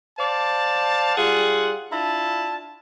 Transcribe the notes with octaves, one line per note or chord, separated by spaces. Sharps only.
C5 D5 F5 A5
G3 F4 G#4 F#5
D4 E4 F4 A5